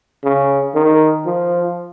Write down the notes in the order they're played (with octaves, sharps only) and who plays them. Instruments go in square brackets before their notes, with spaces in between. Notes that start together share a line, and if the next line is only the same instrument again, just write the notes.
[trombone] C#3
D#3
F3